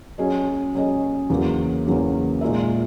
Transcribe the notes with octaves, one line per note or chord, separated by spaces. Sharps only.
F#3 C#4 G#4 D#5
F#3 C#4 G#4 D#5
E2 C#3 F#3 A#3
E2 C#3 F#3 A#3
A#2 G#3 D#4 A#4 E5